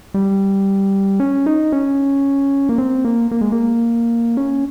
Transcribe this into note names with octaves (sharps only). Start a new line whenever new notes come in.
G3
C#4
D#4
C#4
A#3
C4
A#3
A#3
G#3
A#3
C#4